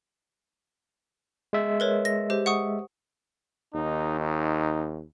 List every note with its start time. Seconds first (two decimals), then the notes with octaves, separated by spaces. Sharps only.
1.53 G#3 E5
1.80 A#4 B4 C#5
2.05 A#6
2.30 G4 C5
2.46 F#5 C#6 D#6
3.74 D#2 D#4
4.20 D#4